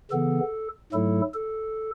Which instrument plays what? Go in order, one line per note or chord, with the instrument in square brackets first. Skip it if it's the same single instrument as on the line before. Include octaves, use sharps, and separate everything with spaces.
[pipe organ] C#3 E3 B3 A4
G#2 F#3 A3 E4 A4
A4